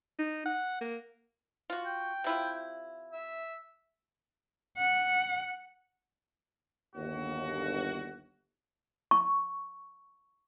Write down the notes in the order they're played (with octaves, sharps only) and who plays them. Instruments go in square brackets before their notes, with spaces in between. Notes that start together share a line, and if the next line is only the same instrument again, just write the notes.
[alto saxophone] D#4
F#5
A#3
[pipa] F4 F#4
[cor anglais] G5
[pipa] C3 E4 F4
[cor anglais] E5
[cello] F#5
[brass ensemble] G1 D#2 F#4
[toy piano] C#6